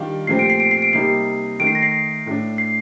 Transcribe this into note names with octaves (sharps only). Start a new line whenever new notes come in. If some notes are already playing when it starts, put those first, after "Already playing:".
Already playing: D#3 G3 D4 F4
A#2 F3 A3 C4 G4 C7
D7
C7
D7
C7
D7
C3 G3 A#3 D#4 C7
D#3 A3 D#4 D7
C7
A#6
C7
A2 A3 D4
C7